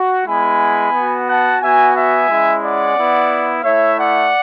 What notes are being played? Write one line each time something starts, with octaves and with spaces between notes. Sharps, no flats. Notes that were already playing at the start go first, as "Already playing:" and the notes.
Already playing: F#4
G#3 B3 E4 G#5 B5
B3 F#4
F#5 A5
B3 F#4 E5 G#5
E5 G#5
G#3 C#4 E4
D5 F#5
B3 E4
A3 E4 C#5 E5
D5 F#5